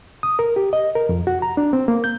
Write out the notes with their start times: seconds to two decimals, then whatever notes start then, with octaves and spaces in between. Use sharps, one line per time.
0.23 D#6
0.39 A#4
0.56 G4
0.73 D#5
0.95 A#4
1.09 F2
1.27 F#4
1.42 A#5
1.57 D4
1.73 C4
1.88 A#3
2.04 G6